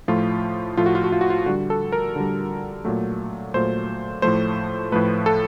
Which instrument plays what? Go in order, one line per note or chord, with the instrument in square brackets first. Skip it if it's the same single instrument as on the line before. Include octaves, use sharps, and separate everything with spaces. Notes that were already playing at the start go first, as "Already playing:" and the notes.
[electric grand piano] A2 F3 A3 F4
A2 F3 A3 F4
F#4
F4
F#4
F4
F#4
F4
D3 G3 F#4
A4
A#4
D3 G3
A#2 F#3 A3
A#2 F#3 A3 C5
A2 F3 A3 C5
A2 F3 A3 B4
A4